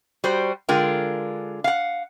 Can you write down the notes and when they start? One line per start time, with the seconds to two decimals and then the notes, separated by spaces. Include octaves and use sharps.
0.24 G3 F#4 C5
0.69 D3 G#3 F4 A#4 G5
1.64 F5 F#5